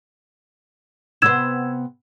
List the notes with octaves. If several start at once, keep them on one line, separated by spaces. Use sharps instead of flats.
C3 B3 C5 E6 G#6 E7